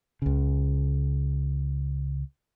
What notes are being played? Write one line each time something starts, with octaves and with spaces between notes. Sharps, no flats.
C#2 C#3